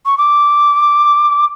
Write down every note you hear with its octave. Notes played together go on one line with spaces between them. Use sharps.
C#6
D6